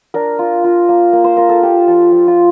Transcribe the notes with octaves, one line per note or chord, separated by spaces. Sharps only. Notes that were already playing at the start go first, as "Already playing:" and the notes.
D4 A#4
F4
F4
A#3
A#3
C5
F4 A#4
A4
F4 G4
F3 A4
F3
F4